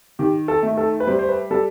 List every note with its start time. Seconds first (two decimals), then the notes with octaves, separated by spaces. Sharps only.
0.19 D#3 G4
0.48 A4
0.63 A3
0.77 A4
1.00 B4
1.07 G3 C5
1.19 C5
1.29 B4
1.51 G3 A4